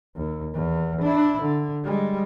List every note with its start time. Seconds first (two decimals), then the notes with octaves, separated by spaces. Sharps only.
0.16 D#2
0.54 E2
1.01 D4 E4
1.42 D3
1.84 G3 G#3